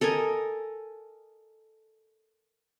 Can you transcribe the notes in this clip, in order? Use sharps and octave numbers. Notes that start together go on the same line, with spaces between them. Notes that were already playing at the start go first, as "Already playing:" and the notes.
A4 A#4 D#5 G#5